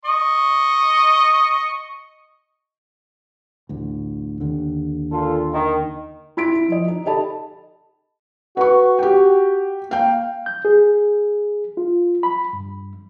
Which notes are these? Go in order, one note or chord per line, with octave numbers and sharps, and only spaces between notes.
D#5 C#6
A1 D2
D#2 D3
A#2 F4 A4
D#3
E4 C6 B6 D7
E4
F3 D#5
D#4
G4 A4 D#5 A5 B5
F#4 B4 C#6
G4 G5
A#3 F5 G5
G6
G#4
F4
B5
G2